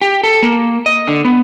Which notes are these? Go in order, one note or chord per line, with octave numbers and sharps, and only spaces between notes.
G4
A4
A#3
D#5
D3
B3